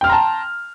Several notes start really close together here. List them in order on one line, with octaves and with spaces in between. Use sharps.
G5 F6 C6 A#5 A5